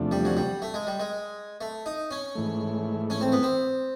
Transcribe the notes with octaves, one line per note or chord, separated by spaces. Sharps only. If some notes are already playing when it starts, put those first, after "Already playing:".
Already playing: E2 C3 F3 A3 D4
G3
F#3
G3
A3
G#3
G3
G#3
A3
D#4
C#4
G#2 E3 A3
C#4
C4
B3
C4